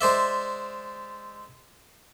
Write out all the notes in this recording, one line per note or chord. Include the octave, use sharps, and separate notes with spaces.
G#3 C5 D5 E5